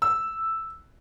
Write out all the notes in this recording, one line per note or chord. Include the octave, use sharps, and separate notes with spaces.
E6